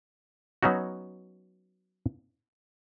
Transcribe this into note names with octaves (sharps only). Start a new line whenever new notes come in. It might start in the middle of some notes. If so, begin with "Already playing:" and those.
F#3 B3 C#4 D#4 F#4